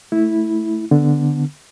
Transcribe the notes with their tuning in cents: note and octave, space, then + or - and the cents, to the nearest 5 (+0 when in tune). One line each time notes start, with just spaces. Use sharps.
A3 +0 E4 -10
D3 +0 B3 +10